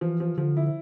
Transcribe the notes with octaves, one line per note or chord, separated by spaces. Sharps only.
E3 F3
F3
D3 F3
E4